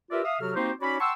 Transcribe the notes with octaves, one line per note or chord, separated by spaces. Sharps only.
F4 G4 A#4 B4 D5 E5
E5 F5 D#6
C3 F#3 F#4 A4 F6
A#3 C4 D#4 F#4 G4 C5
C#4 D#4 F#4 C#5 D5 B5
F#5 G5 A5 C6 C#6 E6